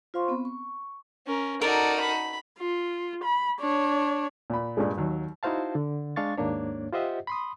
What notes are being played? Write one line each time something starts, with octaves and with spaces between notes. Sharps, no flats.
F4 C5 F5 C6 C#6
B3 C4 B5
C#6
C#4 A#4
D#4 F#4 A4 A#4 D5
B5
F4
B5
D4 C#5
A#2 B5
G2 A#2 G#3
D#2 F#3
D#4 E4 F#4 C5 F5 A5
D3
G#3 D4 F5 C#6 A6
D#2 G#2 A#3 D4 C#5
F4 G4 C5 D#5 E5 F#5
B5 C6 D#6